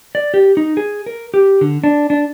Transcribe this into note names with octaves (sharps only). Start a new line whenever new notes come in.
D5
G4
D#4
G#4
A#4
G4
D3
D4
D4